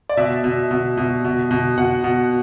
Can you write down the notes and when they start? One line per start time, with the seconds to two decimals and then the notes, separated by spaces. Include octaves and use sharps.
0.09 D5
0.17 B2 E5
0.44 B2
0.71 B2
0.97 B2
1.25 B2
1.51 B2
1.78 B2 F#5
2.04 B2